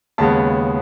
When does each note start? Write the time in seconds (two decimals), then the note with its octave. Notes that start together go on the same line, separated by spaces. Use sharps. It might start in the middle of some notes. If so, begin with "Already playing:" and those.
0.18 D#2 C#3 G#3 B3 A5